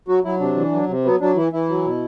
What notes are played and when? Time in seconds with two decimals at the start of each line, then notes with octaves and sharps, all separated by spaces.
0.08 F#3 F#4
0.24 F#3 E4
0.40 C3 D4
0.56 E3
0.72 F#3
0.88 C3
1.04 F#3 B3
1.20 F#3 D4
1.36 E3 E4
1.52 E3 E4
1.69 F#3
1.84 B2